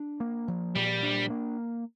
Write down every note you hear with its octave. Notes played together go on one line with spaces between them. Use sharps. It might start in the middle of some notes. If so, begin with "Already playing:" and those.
Already playing: D4
A#3
F3
A#2 G3
D4
A#3